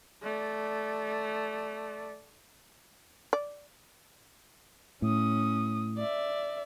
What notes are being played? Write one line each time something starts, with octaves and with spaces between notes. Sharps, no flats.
A3 D5
D5
A2 C#4 D#6
D5 E5